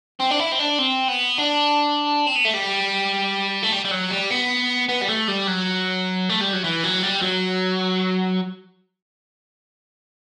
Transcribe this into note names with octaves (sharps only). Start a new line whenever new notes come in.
C4
D4
E4
C4
D4
C4
B3
D4
C4
B3
A3
G3
A3
G3
G3
F#3
G3
B3
B3
G3
A3
G3
F#3
A3
G3
F#3
E3
F#3
G3
F#3